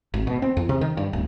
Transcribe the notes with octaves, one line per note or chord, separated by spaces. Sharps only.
G#1
B2
C4
E2
C3
D#3
G2
D1